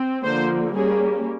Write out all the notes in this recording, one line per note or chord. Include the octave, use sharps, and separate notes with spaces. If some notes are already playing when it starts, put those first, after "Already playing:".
Already playing: C4
D3 F3 A#3 C5
G3 A#3 C#4 G#4